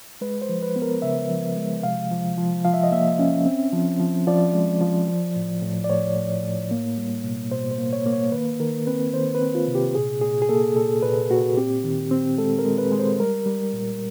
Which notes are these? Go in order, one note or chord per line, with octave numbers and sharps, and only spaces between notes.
G#3 B4
C5
F3
B4
B3
A#4
C#3 E5
F3
G#3
C3 F5
F3
F3
F3 F5
E5
D#5
A#3 E5
C#4
C4
F3
F3
F3 D5
G#3
F3
F3
A2
A2
D5
A2 C#5
A2
A2
A#3
G3
B2
B2 C5
C5
A#3
C#5
A#3
C#5
D#3 B4
D#3 A#4
C4 B4
D#3 C5
B4
C4
F4
C3
G4
A#2 G#4
A#2 G#4
G#4
A#3 A4
A#2 A4
A#2 B4
A#2 F#4
C4 G4
D#3
C4
G#3 A4
A#4
G#3
B4
G#3
C5
G3 A#4
G3
A#2